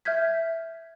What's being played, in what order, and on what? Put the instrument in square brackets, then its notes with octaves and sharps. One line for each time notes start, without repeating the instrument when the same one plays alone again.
[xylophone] E5 F6 G6 G#6 B6